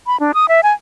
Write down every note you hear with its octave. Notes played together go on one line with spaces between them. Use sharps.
B5
D4
D#6
E5
G#5